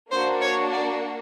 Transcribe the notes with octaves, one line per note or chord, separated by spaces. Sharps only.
A#3 D4 F#4 C5
C#5
D5